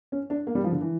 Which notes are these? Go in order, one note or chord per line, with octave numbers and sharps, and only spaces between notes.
C#4
D4
A#3
G3
F3
D3
E3